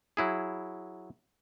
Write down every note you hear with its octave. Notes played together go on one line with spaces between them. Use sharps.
F#3 E4 G#4